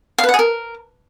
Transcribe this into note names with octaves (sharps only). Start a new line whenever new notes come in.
F5
B4
F#5
G#4
A#4